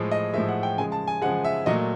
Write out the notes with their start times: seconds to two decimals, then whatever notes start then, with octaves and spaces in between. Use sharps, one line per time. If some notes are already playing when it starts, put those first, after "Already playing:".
Already playing: A2 F3 G#3
0.11 D#5
0.34 A2 F3 G#3 E5
0.48 F#5
0.63 G5
0.77 C#3 F3 G#3 G#5
0.92 A5
1.07 G#5
1.22 C#3 F3 G#3 F#5
1.44 E5
1.66 A#2 F#3 A3 D#5